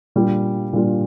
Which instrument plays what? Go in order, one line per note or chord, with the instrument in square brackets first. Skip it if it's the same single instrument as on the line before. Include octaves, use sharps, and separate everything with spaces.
[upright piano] A#2 G3 D4 F4
A#2 G3 D4 F4